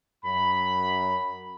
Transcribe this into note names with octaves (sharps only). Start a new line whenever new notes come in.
F#2 B5